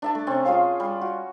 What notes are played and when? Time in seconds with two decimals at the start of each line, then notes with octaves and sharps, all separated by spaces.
0.02 D4 E5 A5
0.15 A3
0.27 C3 C4 C#4
0.45 F4 G#4 C#5 F5
0.80 G3
1.01 F#4